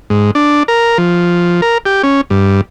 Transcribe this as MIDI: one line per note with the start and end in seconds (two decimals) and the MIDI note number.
0.10 0.31 44
0.35 0.63 62
0.68 0.98 70
0.98 1.61 53
1.62 1.78 70
1.86 2.02 67
2.03 2.21 61
2.30 2.61 43